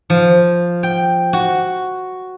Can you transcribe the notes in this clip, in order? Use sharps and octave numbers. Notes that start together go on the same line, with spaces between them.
F3
G5
F#4